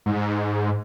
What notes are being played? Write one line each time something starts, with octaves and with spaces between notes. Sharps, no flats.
G#2